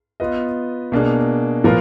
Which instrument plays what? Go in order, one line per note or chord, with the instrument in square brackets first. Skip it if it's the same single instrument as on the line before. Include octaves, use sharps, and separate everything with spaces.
[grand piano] B3 F4 B4 D#5
B2 A#3 D4 G#4
A#2 F3 B3 F4 A#4